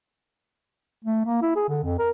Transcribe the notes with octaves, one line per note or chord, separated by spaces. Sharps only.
A3
A#3
E4
G#4
D3
F2
A#4